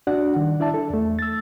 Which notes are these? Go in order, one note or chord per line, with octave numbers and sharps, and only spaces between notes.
D4 F#4 D5 F#5
D#3 G3
D4 E4 D5 E5 A5
A4
E2 A3
E6 A6